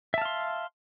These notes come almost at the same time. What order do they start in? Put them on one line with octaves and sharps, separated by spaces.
E5 A5 F5 C6